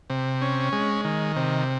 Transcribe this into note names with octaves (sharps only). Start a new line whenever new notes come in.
C3
C#4
G#3
D#3
C3